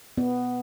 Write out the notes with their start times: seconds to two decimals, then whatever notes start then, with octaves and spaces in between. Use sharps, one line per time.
0.18 B3